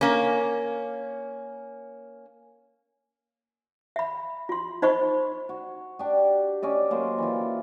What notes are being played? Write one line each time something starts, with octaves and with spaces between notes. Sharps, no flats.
A#3 C#4
E5 B5
F4 C6
D#4 C5 D#5 B5 C#6
F#4
D4 G4
C#4 D5 D#5
F#3 A#3 C5 C6
E3 F4